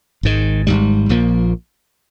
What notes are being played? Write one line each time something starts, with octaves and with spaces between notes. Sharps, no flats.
G#1 G#2 D#3
G#1 G#2 G3
A#1 A#2 F3 A#3